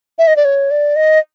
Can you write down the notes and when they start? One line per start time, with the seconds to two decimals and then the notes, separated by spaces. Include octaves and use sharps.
0.19 E5
0.27 D#5
0.36 D5
0.45 C#5
0.71 D5
0.96 D#5